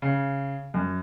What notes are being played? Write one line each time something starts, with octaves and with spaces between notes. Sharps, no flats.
C#3
F#2